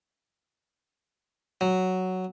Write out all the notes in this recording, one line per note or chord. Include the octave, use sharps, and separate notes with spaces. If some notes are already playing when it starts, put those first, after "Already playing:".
F#3